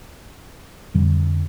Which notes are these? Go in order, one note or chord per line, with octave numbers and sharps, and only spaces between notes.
F2 D3 G3